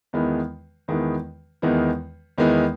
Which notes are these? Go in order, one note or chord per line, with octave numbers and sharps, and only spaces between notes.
E2 D#3 G#3 B3 E4
E2 D#3 G#3 B3 E4
E2 D#3 G#3 B3 E4
E2 D#3 G#3 B3 E4